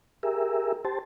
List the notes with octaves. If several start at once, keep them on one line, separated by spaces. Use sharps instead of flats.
G4 G#4 A#4 E5
G4 C5 A5